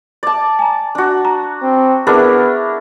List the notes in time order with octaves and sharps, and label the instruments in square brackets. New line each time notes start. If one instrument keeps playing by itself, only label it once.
[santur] D5 A5
[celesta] G#5 A#5
[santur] D4 F#4
[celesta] A#5
[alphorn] C4
[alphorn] B3 [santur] D4 E4 A#4 [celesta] G#4